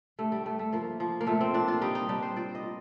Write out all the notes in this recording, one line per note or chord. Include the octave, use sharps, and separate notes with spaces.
G2 A3
G3
G2 A3
A3
F3 A#3
F3
A#3
A#2 A3
C4
A#2 D4
F4
G3 D#4
D#4
G3 D4
C5
A#2 D5
D#5
A#2